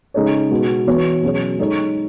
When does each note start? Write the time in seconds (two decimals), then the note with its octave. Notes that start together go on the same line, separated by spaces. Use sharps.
0.14 C#3 G#3 D#4 A4 C#5
0.51 B2 G#3 B3 F#4
0.87 E3 B3 F#4 C#5
1.23 B2 F#3 C#4 G#4 C#5
1.58 G#3 D#4 A4 C#5